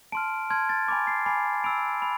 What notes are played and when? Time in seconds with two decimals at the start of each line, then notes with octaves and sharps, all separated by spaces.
0.12 A5 C6 F6 D7
0.50 A5 C6 F6 G#6
0.69 A6
0.88 G#5 B5 D6 A6
1.07 C7
1.26 G#5 B5 D6 C7
1.64 B5 E6 D7
2.02 B5